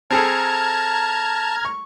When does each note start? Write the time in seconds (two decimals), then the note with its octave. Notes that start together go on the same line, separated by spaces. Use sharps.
0.11 C4 G#4 A4 A5 A#5 F6 G#6
1.65 C#6